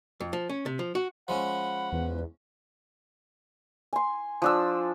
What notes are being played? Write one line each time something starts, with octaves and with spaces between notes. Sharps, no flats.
F2
F3
C#4
C3
F3
F#4
F3 G#3 C#4 F#5 B5
E2 B4
G#5 C6
F3 D4 E6